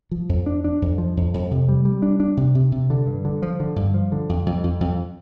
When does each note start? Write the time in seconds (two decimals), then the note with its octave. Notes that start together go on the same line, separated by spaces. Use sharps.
0.11 F3
0.29 F2
0.46 D4
0.64 D4
0.82 F2
0.98 F3
1.17 F2
1.34 F2
1.51 C3
1.69 G3
1.85 G3
2.02 D4
2.20 D4
2.37 C3
2.55 C3
2.72 C3
2.90 D3
3.07 G2
3.25 D3
3.42 F3
3.60 D3
3.76 G2
3.94 F3
4.12 D3
4.29 F2
4.46 F2
4.64 F2
4.81 F2